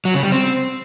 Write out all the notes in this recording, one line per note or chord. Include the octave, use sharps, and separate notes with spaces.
F#3
C#3
G3
C4